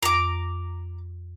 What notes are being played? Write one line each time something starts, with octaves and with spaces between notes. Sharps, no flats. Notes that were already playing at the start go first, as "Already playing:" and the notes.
F2 A#5 D6